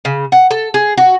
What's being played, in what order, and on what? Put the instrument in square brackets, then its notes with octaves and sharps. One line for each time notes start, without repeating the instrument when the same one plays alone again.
[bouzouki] C#3
F#5
A4
G#4
F#4